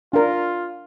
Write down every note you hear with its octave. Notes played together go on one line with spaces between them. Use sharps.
D4 F4 A#4